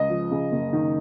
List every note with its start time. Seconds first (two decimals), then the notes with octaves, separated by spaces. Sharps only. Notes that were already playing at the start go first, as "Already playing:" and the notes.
Already playing: C#2 D#5
0.10 F3
0.31 C#3
0.52 F#1
0.73 D#3